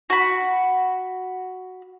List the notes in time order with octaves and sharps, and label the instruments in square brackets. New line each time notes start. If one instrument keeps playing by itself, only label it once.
[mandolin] F#4 B5